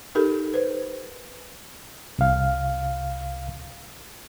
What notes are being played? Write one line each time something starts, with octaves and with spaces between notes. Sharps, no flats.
D#4 G4 A4 A#4
B4 C5
C2 F5